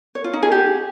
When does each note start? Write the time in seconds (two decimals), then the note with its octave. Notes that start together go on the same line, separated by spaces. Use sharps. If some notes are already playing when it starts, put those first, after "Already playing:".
0.15 C#5
0.24 F4
0.33 D#4
0.43 G#4
0.52 G4